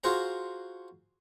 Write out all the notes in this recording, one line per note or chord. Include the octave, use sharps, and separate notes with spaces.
F4 F#4 G#4 C5 A#5